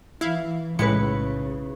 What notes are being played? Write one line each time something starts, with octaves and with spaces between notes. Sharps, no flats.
E3 E4 E5 F5
B1 A2 C#3 G#3 E4 B4 C#7